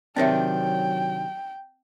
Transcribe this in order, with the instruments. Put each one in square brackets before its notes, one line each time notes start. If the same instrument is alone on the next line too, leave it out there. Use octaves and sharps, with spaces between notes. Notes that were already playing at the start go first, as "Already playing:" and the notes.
[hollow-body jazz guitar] C3 D#3 D4 [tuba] F#3 [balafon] C4 C#5 E5 [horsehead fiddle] G5